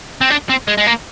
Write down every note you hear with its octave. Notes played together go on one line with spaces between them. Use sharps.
C4
D4
C4
G#3
G#3
A#3